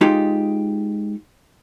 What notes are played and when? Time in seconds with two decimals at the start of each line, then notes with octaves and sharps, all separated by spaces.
0.01 G#3 D#4 F4 G4